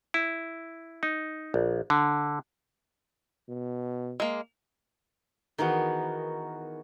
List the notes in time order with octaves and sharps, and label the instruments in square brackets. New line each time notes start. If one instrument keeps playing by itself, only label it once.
[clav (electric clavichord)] E4
D#4
A#1
D3
[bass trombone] B2
[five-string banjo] G#3 A#3
[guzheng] D#3 E3 B3 [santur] F#4 G#4 A#4